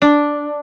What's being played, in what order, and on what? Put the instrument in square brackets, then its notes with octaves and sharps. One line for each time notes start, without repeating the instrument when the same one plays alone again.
[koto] D4